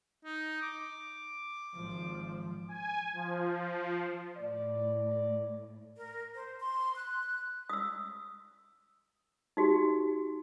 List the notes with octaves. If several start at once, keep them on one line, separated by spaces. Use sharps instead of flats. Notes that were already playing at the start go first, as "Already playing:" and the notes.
D#4
D6
G#1 F3
G#5
F3
A2 D5
A#4
C5
C6
F#6
D#6 E6
D#4 F#4 G4